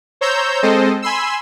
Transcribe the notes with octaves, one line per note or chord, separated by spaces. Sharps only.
C5 C#5 A#5 E6 G6
G#3 C4 A4 C5 D#5
G#5 B5 C6 E6